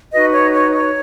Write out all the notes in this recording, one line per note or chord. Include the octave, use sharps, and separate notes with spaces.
D#4 F#4 B4 D#5
C#5
C#5
C#5